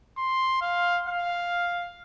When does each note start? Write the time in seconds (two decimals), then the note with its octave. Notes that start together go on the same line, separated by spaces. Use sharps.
0.18 C6
0.61 F5
1.07 F5